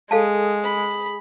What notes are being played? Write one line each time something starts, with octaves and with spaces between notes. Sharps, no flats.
G#3 G#4 A4 F5 A5
B5